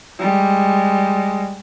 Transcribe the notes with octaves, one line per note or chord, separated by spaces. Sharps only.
G3 G#3